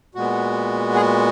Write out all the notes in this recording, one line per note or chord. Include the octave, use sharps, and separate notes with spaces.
A#2 G#3 B3 F#4
G#4
F#4